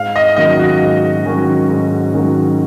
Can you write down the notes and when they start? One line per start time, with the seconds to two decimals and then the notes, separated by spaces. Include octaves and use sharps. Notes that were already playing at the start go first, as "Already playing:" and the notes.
Already playing: G#2 F5
0.16 D#5
0.36 D#3 F#3 C#4 F#4 D#5
0.60 F#4
0.81 G#2
1.25 D#3 F#3 C#4 F#4
1.69 G#2
2.13 D#3 F#3 C#4 F#4